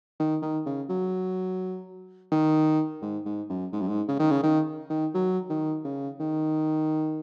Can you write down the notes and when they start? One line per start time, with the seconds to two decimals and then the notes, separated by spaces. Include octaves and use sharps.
0.20 D#3
0.42 D#3
0.66 C#3
0.89 F#3
2.32 D#3
3.02 G#2
3.26 G#2
3.50 F#2
3.72 G#2
3.81 F#2
3.88 G#2
4.08 C#3
4.19 D#3
4.31 C#3
4.43 D#3
4.90 D#3
5.14 F#3
5.50 D#3
5.85 C#3
6.20 D#3